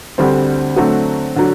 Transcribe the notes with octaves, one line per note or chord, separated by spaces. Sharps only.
D2 D3 G3 C4
D3 F#3 A3 C4 F#4
D3 F#3